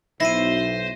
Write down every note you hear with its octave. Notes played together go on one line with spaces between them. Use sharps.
B1 E4 C5 A#6 C7 D#7